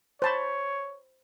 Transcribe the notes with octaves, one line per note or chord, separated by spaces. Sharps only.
C5 C#5 A5 B5